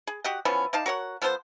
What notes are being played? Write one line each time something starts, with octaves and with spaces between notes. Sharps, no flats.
G#4
F#4 G4 D#5 F#5
E3 F3 B3 C#4
D#4 D5 F5 A5
F#4 A#4 C#5 F#5
F3 B3 A4 C5